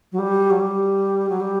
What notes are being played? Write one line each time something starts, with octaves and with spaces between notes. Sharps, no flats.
F#3
G3
F#3
G3
F#3
G3